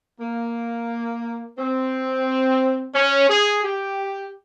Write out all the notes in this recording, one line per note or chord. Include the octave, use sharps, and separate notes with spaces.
A#3
C4
C#4
G#4
G4